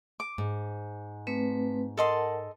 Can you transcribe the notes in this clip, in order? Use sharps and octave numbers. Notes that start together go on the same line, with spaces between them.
D6
G#2
A3 C4 B4
A4 A#4 D#5 F#5 A5 C6